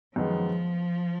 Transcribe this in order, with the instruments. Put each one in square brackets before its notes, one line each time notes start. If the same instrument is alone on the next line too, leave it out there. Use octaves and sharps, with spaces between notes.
[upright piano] F#2 D#3 G#3 B3 [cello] F3